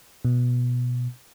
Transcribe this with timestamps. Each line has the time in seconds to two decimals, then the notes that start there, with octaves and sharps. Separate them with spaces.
0.25 B2